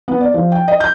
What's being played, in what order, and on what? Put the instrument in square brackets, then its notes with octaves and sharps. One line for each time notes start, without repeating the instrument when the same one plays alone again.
[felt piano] B3
D5
F3
G5
D#5
G6